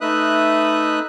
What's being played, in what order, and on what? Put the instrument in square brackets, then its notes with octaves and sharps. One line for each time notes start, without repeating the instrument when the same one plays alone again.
[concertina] A3 D#4 B4 E5 D#6 F#6